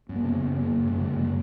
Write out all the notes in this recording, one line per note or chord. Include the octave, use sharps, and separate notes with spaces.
F#2
A#3
C#3 B3
F#2
C#3 A#3
F#2
C#3 G#3
A#3
F#2 G#3
A#3
G#3
C#3 A#3